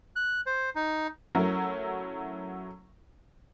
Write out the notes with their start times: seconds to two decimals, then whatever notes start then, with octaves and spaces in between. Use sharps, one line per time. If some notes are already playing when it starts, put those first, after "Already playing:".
0.16 F#6
0.46 C5
0.75 D#4
1.35 F#3 A3 C#4 E4 A#4